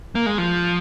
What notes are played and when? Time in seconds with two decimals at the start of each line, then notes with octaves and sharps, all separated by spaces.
0.15 A#3
0.26 G#3
0.38 F3